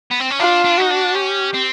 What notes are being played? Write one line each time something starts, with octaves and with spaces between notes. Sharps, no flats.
B3
C4
C#4
D4 F4
D4
D#4 F#4
D4
C#4 G4
C4